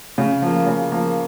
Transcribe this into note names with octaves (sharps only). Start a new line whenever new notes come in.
C#3
F3 A#3
C#3
F3 A#3